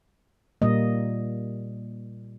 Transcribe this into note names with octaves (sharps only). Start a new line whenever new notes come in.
A#2 G3 A#3 D#5